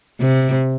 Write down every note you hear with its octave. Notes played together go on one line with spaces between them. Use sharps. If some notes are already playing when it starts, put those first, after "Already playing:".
C3